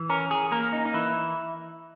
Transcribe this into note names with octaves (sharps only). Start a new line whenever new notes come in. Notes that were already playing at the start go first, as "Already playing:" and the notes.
Already playing: E3
C#4 A#4
G#4
A#3 A#4
D#4
D#4
E3 E4